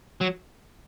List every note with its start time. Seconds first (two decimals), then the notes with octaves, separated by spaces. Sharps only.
0.21 F#3